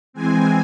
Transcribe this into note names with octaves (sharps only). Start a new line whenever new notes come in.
E3 G#3 C4 G#5